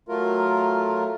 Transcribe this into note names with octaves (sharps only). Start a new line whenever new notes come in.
F#3 A3 F4 A#4